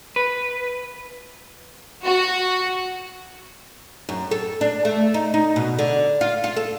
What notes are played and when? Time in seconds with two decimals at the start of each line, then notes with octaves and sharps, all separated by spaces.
0.16 B4
2.03 F#4
4.09 F#2
4.31 A4
4.61 D4
4.85 A3
5.14 D#4
5.34 D#4
5.56 B2
5.79 D3
6.21 F4
6.44 F4
6.57 A4